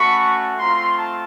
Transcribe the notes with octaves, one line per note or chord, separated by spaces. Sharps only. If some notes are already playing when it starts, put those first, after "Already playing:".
Already playing: A3 C#4 F#4 B5 C#6
A3 C4 F4 A#5 C6
A5